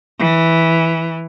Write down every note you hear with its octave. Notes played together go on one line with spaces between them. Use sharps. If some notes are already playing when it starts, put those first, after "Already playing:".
E3